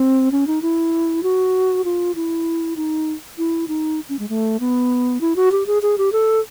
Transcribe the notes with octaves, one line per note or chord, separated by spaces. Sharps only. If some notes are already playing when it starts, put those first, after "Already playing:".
Already playing: C4
C#4
D#4
E4
F#4
F4
E4
D#4
E4
D#4
C#4
G#3
A3
B3
E4
F#4
G4
G#4
G#4
G4
A4